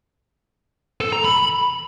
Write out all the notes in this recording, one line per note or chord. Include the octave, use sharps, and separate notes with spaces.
A4
A#5
B5